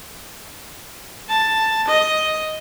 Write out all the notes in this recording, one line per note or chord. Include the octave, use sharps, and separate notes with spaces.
A5
D#5